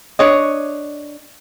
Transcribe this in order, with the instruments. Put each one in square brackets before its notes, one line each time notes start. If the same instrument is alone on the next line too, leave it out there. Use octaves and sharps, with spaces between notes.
[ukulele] D4 C#5 D#5